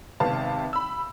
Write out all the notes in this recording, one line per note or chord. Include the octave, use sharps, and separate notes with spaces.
G#1 C3 B3 F5 A5
B5 E6